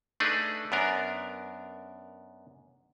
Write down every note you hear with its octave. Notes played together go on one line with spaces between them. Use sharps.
A3 D4 D#4 G#4 B4
F#2 B3 D4 A#4